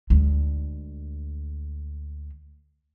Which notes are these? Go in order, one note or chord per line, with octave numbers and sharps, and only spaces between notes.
D2 G#3